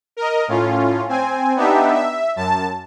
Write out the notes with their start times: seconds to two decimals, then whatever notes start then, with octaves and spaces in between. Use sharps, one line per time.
0.17 A#4 D#5
0.48 A2 C#4 F4
1.09 C4 G#5
1.56 B3 D4 D#4 G4 E5
1.95 E5
2.36 F#2 A5